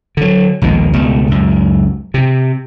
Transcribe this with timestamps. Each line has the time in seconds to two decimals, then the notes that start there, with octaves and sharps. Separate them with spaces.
0.17 D3 F#3
0.62 A#1 D#2 B2 G#3
0.93 C#2 B2 G3 A3
1.29 C#2 F#2
2.14 C3